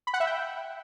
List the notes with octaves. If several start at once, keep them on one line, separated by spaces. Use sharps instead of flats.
B5
F#5
E5
G5